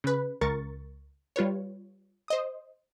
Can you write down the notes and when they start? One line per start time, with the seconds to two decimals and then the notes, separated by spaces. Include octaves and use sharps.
0.04 C#3 B4
0.41 C#2 A#4 C#6 A6
1.36 G3 F4 B4 C#5
2.28 C5 D#5 D#6